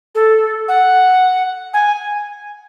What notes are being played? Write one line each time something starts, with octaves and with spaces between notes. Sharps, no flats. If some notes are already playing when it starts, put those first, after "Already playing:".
A4
F#5
G#5